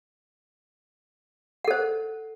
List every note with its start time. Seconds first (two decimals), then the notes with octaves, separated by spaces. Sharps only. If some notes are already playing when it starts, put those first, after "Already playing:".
1.65 F#5
1.68 A4
1.71 C5